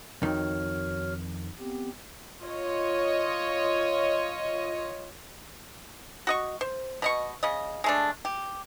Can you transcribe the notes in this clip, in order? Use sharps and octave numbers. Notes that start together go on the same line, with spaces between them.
F2 D#3 F#4 C#5 F6
B3 C4 G4
F4 C#5 D#5
F#4 D#5 C#6
C5
B2 D#5 C#6
C#3 D#5
G#3 A3 D4
G4